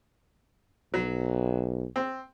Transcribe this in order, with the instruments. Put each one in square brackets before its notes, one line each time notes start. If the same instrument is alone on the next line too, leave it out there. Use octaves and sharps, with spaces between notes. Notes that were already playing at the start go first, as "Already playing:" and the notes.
[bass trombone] B1 [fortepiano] F#3
[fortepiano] C4